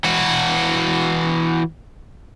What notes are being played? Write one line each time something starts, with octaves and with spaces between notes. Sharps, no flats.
E3 F#4